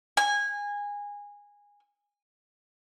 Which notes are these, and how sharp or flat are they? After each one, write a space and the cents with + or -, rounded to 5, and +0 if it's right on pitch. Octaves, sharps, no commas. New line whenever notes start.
G#5 -20